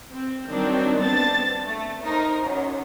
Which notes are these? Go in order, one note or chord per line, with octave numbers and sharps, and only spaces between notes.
C4
D#3 F#3 G3 C4 D4
B3 C4 D4 A5 A6
A3
D#4 A#4 C5
F#2